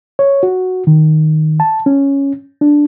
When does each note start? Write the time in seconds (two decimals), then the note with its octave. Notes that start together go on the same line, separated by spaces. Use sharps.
0.19 C#5
0.43 F#4
0.87 D#3
1.60 A5
1.86 C#4
2.61 D4